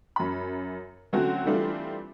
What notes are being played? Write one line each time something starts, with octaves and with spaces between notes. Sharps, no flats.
F#2 B5
D3 F#3 A3 C4 C#4 F#4
E3 G3 A3 C4 D4 F4